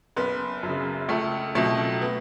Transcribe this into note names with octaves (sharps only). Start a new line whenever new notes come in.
F#1 B3
F#2 C#3
C#2 A3
B2 F#3 A3
B3